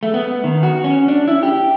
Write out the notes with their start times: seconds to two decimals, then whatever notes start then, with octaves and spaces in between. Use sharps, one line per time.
0.03 A3
0.14 B3
0.44 D#3
0.63 F#4
0.84 C#4
1.08 D4
1.28 E4
1.43 G4